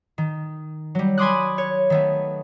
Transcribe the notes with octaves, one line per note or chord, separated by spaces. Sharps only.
D#3
F#3 G3
G#5 B5 C6 D6 D#6 F#6
C#5
D#3 A3 B3